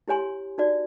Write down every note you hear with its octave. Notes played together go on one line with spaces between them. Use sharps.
E4 G4 C#5 G#5 C6
D#4 F#4 D5